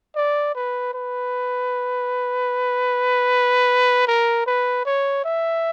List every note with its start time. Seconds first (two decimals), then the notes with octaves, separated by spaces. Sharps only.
0.15 D5
0.55 B4
0.94 B4
4.08 A#4
4.47 B4
4.85 C#5
5.25 E5